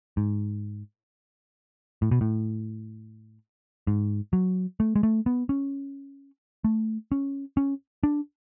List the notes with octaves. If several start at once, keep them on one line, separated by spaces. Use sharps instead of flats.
G#2
A2
B2
A2
G#2
F#3
A3
G#3
A3
B3
C#4
A3
C#4
C#4
D4